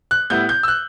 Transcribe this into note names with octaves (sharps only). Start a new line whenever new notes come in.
F#6
A2 G3 B3 E4 G6
G6
E6
F#6